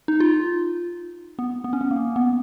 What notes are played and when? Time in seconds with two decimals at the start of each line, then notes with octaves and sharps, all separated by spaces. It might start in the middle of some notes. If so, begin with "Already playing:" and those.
0.08 D#4
0.20 F4
1.39 B3
1.64 B3
1.73 C#4
1.81 B3
1.91 A#3
2.16 B3